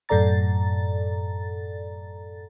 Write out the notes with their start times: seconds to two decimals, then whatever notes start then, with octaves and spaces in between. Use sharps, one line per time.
0.09 F#2 A2 A4 D5 A#5 A6